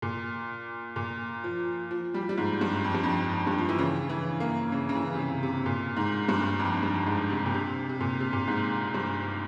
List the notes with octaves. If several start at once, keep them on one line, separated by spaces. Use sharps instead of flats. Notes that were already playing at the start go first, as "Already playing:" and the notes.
A#2
A#2
F3
F3
G3
F3
G3
G#2
G2
F2
G2
F2
G2
F3
E3
C#3
E3
A#3
C#3
C#3
E3
C3
C#3
C3
A#2
G#2
G2
F2
G2
G#2
C3
A#2
C3
C3
A#2
C3
A#2
G#2
G2